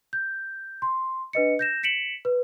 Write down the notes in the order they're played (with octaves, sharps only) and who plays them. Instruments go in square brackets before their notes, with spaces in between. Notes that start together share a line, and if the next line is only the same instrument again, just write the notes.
[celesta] G6
C6
D4 B4 D#5 C#7
G6 A#6 E7
B6 C#7 D7 E7 F#7
B4